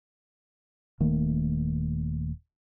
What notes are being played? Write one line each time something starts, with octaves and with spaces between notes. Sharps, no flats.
D#1 D#3 A3 A#3